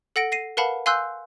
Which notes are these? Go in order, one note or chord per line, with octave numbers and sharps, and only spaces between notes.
A4 F#5 A#6 D7
A#6 C7 D#7
A#4 B4 F5 F#5 A5 B5
F5 G#5 C6 E6 F#6 G6